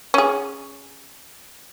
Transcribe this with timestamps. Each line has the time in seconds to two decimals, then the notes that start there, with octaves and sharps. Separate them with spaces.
0.14 C#4 G#4